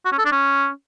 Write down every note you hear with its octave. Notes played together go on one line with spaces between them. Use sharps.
F#4
C#4
A4
D4
C#4